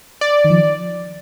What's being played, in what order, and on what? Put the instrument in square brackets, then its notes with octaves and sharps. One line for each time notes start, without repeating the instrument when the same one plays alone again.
[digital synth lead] D5
[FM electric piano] D#3
F3